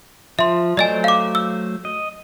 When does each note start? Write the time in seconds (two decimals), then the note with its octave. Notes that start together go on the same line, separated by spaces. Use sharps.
0.39 F3 E5 C6
0.77 F#3 A3 C5 D5 D#5 G#5
1.04 F5 D6
1.35 E6
1.85 D#5